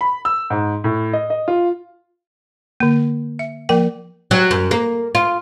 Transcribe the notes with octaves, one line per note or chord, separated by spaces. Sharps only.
B5
E6
G#2
A2
D#5
D#5
F4
D3 A#3
E5
F3 A#3 A#4 G5
F#3
F#2
A#3
F4